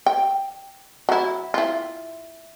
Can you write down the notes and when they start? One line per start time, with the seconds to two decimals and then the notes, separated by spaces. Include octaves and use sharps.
0.06 G5
1.09 F#3 E4
1.54 E4 F4